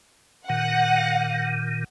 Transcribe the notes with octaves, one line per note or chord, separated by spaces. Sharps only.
A#2 D#3 F#5